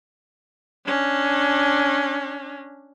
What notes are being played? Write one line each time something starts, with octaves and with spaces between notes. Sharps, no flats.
C#4 D4